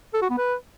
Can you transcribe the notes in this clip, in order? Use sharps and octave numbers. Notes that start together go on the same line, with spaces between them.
A4
F#4
B3
B4